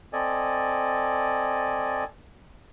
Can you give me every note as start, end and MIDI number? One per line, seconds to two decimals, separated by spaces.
0.13 2.04 60
0.13 2.04 69
0.13 2.04 74
0.13 2.04 75
0.13 2.04 80